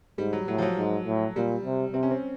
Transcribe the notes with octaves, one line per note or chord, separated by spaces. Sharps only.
G#2 G3
F#3
A2 F#3
F3
F#3
G#2
A2
A#2 G3
C3
C3 C4
C#4
C4